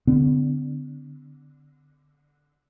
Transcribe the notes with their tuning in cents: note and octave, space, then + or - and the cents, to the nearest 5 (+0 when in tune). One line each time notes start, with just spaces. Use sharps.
D3 -5 B3 +45